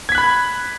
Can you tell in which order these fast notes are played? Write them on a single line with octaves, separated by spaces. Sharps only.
G#6 B6 F#6 B5